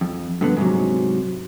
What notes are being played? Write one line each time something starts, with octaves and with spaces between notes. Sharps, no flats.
F2
G2 D3 B3
G#2 C3 F#3